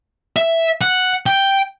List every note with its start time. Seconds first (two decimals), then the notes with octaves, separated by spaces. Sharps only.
0.36 E5
0.81 F#5
1.26 G5